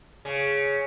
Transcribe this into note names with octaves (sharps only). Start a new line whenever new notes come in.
C#3